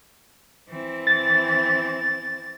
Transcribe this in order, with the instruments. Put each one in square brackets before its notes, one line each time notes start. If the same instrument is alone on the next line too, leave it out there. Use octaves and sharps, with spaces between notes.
[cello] E3 C4
[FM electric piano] A6